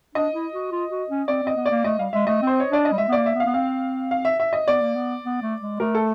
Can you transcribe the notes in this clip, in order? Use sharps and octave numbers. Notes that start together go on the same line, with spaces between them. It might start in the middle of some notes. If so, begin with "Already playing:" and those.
D4 D#5
E4
F#4
F4
F#4
C#4
C4 D5
C4 D#5
B3
D5
A#3
A3 D#5
G3 F5
G#3 E5
A3 D#5
C4
C5
C#5
D4 D5
D#5
G3
G#3 E5
B3
A#3 D5
E5
B3
F5
B3
C4 F5
F5
E5
E5
D#5
B3 D5
A#3
B3
B3
A3
G#3
A3 A#4
A4